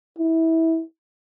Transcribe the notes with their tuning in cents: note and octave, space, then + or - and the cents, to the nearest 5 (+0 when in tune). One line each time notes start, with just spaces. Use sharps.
E4 -20